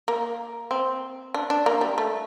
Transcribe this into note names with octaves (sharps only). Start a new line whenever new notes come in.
A#3
C4
D4
D4
A#3
G3
A3